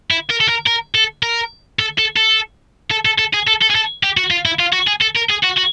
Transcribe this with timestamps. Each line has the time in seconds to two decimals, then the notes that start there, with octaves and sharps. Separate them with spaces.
0.11 E4
0.30 A#4
0.41 A4
0.49 A#4
0.67 A#4
0.95 A4
1.23 A#4
1.79 A4
1.98 A4
2.16 A4
2.91 A4
3.05 A4
3.19 A4
3.34 G#4
3.47 A4
3.62 A4
3.70 G#4
3.75 A4
4.03 G4
4.17 F#4
4.31 F4
4.45 E4
4.59 F4
4.73 F#4
4.87 G#4
5.01 A4
5.15 A#4
5.29 G#4
5.43 F#4
5.57 F#4